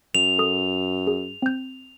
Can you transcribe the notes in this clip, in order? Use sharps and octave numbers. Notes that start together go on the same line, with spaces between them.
F#2 F7
A4 D#6
G#4
C4 G6